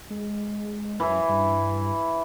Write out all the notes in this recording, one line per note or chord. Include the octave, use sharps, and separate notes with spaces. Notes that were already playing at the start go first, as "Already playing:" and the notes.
G#3
F#2 E3 E4
G2